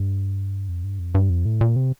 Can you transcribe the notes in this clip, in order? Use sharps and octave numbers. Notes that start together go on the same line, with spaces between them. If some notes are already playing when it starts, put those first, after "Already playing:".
Already playing: G2
F2
G2
F2
G2
F2
A2
A#2
C3